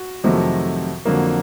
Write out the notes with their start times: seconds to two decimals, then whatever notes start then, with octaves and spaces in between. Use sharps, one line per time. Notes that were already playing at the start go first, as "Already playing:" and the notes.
Already playing: F#4
0.24 F2 C3 D#3 F#3 A3
1.05 F2 D3 F#3 A#3